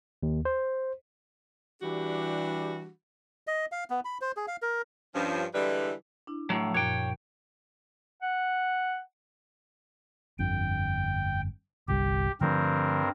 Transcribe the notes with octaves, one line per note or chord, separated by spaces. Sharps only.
D#2
C5
E3 G3 D4 F#4 G4
D#5
F5
B3
B5
C5
G#4
F5
A#4
G2 F3 C#4
D3 E3 G3 G#3 E4 B4
D4 E4
A2 F#3
F3
F#2 A#2 C#5 G5 F#6
F#5
G1 F2 D3 G5
G1 C2 G3 G4
G2 D3 F3 A3 C4 A#4